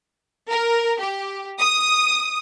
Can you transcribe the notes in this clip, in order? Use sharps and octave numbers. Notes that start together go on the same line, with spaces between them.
A#4
G4
D#6